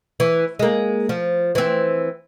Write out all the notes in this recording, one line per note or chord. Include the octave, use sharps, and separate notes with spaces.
E3
G#3 A#3
F3
E3 C4